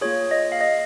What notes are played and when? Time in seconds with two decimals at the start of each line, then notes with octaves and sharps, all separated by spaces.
0.01 A#3 F4 G#4 C#5
0.31 D#5
0.52 F5
0.61 D#5